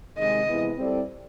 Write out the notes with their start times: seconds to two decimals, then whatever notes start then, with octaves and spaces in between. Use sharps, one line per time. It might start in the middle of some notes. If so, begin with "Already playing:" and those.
0.17 C3 D#3 G#3 D#5
0.47 C3 E3 G#3 B3 E4
0.78 G3 C4 E4 A4 D5